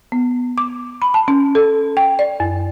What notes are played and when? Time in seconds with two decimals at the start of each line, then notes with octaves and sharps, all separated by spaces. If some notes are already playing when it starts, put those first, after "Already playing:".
0.12 B3
0.58 D6
1.02 B5
1.14 A5
1.28 C#4
1.55 A4
1.97 G5
2.19 D5
2.40 F#2